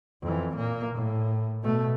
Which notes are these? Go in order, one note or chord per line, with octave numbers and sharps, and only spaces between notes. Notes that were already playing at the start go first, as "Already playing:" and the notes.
F2 E3
A#2 A#3
A2
B2 A3